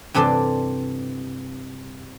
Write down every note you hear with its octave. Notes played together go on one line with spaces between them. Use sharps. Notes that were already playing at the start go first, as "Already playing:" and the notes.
G2 C3 E3 A4 D5 C6